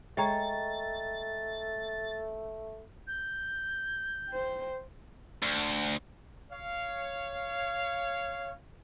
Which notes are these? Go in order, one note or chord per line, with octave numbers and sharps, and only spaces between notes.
G#3 A3 C#5 D#5 G5 A#5 A6
G6
C5 G5
D2
C#5 F5